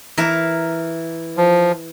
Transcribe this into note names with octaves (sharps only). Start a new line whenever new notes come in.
E3 A#4 E5
F3